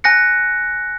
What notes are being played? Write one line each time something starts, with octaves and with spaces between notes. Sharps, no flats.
G#5 F#6 A#6 C#7